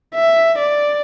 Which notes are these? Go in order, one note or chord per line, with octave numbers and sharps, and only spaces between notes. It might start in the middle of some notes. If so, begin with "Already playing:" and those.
E5
D5